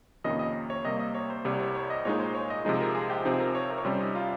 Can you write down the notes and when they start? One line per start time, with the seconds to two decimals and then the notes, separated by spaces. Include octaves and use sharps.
0.24 F2 C3 D#3 A#3 C#4 D#5
0.39 D#5
0.70 C#5
0.84 C3 G3 A#3 D#5
0.99 D#5
1.14 C#5
1.30 C5
1.45 C2 C3 G3 C#5
1.59 C#5
1.75 C#5
1.90 D#5
2.05 A#2 G#3 D#4 C#5
2.20 C5
2.35 C#5
2.50 D#5
2.65 C3 F3 G#3 D#4
2.80 A#4
2.95 G#4
3.10 G4
3.25 C3 F3 C4 D#4
3.32 G#4
3.40 A#4
3.55 C#5
3.70 A#4
3.78 C#5
3.85 C3 G3 C#4 C5
4.00 D#4
4.15 F4